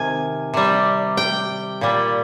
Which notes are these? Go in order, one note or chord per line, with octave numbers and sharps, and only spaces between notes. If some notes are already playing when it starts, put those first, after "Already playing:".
Already playing: C3 D#3 G#5
C3 G3
G5
A#2 G3